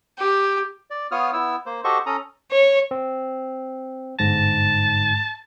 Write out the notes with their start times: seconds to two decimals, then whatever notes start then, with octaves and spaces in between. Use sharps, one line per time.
0.19 G4
0.90 D5
1.11 B3 F4 C#5 D#6 F6
1.33 B3 E4 E6
1.66 A#3 C5
1.84 F#4 G4 A4 C5 D#5 C#6
2.06 C#4 A4 A#5 D#6
2.51 C#5
2.91 C4
4.19 G1 G#2 A5 A#6